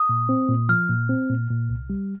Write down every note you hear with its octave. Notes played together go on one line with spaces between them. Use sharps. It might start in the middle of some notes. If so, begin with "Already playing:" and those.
Already playing: D#6
A#2
C4
A#2
F3 F6
A#2
C4
A#2
A#2
C2
G3